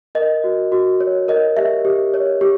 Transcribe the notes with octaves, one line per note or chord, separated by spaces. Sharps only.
A#4 D#5
F#4
F#4
C#5
A#4 D#5
G4 E5
G4
C#5
G4